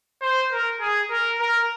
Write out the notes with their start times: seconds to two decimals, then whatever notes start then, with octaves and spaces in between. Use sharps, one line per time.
0.22 C5
0.52 A#4
0.81 G#4
1.11 A#4
1.40 A#4